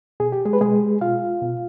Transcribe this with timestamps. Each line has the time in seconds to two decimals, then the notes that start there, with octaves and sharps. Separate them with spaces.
0.20 B2 G#4
0.32 G4
0.46 G#3 G#4
0.53 B4
0.60 B2 G#3 G#4
1.01 B2 F4 F5
1.42 B2